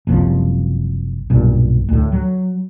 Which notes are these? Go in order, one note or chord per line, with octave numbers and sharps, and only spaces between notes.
F#1 C2 F3
B1 G2 A#2
D2 A2
F#3